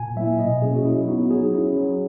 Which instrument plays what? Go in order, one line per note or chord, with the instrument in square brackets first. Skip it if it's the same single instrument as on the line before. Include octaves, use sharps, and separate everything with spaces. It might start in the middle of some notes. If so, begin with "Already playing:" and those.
Already playing: [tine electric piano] A#2 G#5
F#3 A#3 E4 E5
B2 D#5
F#3 A#3 C#4 G#4
F#4
F#3 E4
B3 D#4 F#4
F#3 G#4
C#4 E4
F#3